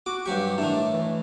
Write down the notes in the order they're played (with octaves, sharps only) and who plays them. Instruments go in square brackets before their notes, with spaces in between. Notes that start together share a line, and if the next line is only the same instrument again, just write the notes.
[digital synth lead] F#4 [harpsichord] D6
[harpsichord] G2 F#3 C#6 [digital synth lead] G4
[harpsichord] A2 D#3 [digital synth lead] D4
[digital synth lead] E3